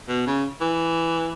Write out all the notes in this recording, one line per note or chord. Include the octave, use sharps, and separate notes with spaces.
B2
C#3
E3